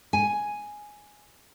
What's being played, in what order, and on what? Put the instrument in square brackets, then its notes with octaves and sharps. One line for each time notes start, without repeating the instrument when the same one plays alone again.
[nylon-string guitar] G#5